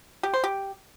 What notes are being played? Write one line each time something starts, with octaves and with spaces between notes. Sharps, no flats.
G4
C5
G4